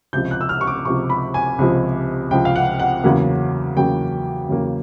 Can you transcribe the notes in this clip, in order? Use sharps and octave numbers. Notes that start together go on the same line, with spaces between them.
C#2 C3 F3 G6
F#6
E6
F6
C#6
D6
C#2 C3 F3 C#6
B5
G#5
C#2 C3 F3
C#2 C3 F3 G5
F5
F#5
F#5
E2 C#3 F#3 A#3
E2 C#3 F#3 A#3 G5
E2 C#3 F#3 A#3